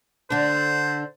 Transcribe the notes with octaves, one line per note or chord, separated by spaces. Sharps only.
D3 D4 C5